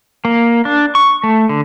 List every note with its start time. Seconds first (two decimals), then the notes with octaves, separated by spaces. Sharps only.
0.25 A#3
0.65 D4
0.95 C#6
1.23 A3
1.49 D3